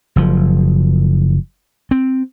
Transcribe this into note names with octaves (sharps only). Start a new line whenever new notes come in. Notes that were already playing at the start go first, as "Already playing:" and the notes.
F#1 F3
C4